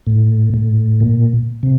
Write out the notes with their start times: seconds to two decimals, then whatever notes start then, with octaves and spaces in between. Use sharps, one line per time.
0.07 A2
0.54 A2
1.00 A#2
1.63 C3